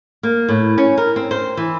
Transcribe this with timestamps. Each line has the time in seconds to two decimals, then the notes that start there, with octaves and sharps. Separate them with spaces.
0.23 A#3
0.49 A2
0.78 C#4
0.98 A#4
1.16 C4
1.31 C5
1.57 E3